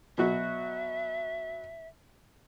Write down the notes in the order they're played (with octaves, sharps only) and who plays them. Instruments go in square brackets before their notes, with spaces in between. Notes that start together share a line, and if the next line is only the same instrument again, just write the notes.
[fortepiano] B2 F#3 F#4 [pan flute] E5